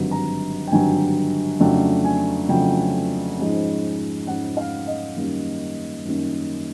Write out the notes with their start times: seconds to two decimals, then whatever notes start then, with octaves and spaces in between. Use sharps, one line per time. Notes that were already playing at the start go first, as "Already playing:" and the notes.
Already playing: G#1 G2 D3 F#3
0.11 A#5
0.67 G5
0.71 G#1 G2 D3 F#3 G#5
1.60 F2 C#3 F#3 A3 D4 G5
2.04 G#5
2.49 F2 C#3 F#3 A3 D4 G5
3.38 G#2 F3 G#3 C#4
4.27 G#2 F3 G#3 C#4 F#5
4.57 F5
4.87 D#5
5.16 F#2 D#3 G3 A#3 C#4
6.05 F#2 D#3 G3 A#3 C#4